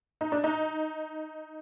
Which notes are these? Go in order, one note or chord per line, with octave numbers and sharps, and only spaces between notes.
D#4
D4
D#4